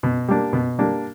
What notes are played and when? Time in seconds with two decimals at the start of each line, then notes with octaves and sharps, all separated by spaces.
0.03 B2
0.28 G3 A#3 D4
0.53 B2
0.79 G3 A#3 D4